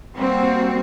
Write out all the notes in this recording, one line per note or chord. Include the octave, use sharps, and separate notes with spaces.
G3 A#3 C4 F#4